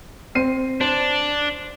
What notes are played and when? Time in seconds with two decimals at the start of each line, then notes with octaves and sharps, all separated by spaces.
0.35 C4 C7 D#7
0.81 D4 C5